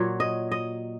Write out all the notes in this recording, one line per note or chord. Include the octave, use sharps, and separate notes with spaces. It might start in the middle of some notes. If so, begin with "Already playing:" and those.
Already playing: A#2 F#3 C#5
D#5
D#5